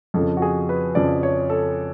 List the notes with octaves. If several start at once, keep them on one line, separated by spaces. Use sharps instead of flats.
F2 C#3 F3 A4
F#4
G#4
B4
F2 C#3 F3 D5
C#5
A4